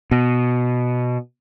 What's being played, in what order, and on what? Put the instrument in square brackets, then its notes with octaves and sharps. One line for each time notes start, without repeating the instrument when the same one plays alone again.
[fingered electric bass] B2